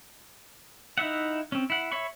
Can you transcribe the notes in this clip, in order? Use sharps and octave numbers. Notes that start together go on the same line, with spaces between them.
D#4 E4 E5 F#5
C4 C#4
E4 F#5
C#5 E5 B5 C#6